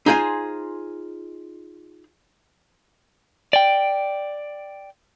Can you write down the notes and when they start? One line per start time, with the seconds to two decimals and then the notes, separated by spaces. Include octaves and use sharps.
0.06 D#4 F4 G#4 C5 G5 G#5
3.53 D5 G5